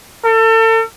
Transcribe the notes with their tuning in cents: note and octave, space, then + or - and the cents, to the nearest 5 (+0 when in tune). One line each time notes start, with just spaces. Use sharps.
A4 +35